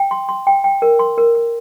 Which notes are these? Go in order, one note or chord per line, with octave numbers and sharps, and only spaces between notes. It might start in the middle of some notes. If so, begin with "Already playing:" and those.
Already playing: G5
C6
C6
G5
G5
A#4
C6
A#4
A#4